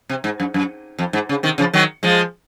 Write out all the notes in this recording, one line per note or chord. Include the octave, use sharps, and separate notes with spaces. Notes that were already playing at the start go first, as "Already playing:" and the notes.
C3
G#2
F#2
F#2
F2
G#2
C#3
C3 D#3
C#3 F3
D#3 F#3
F3 G#3